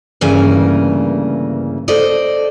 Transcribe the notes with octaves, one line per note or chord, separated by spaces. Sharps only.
D2 G2 C#3 E3 A#3 G#5
A4 C5 D5 D#5